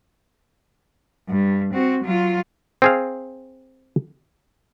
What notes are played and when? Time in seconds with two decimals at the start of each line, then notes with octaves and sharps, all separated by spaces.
1.29 G2
1.74 C4 F#4
2.04 F#3 F4
2.82 C4 G#4 F5